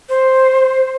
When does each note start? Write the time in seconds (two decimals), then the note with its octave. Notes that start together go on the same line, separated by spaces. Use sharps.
0.09 C5